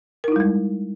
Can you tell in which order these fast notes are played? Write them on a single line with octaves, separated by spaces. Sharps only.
A#4 D#4 E4 G3 G#3